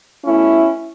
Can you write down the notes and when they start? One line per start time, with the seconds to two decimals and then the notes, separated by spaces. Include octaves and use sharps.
0.25 B2 A3 C#4 E4